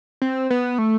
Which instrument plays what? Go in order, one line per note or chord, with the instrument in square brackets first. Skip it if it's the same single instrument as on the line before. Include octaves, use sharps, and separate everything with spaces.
[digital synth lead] C4
B3
A3